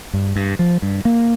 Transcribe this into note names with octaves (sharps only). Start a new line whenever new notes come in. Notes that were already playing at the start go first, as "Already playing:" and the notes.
G2
G2
F3
G2
A#3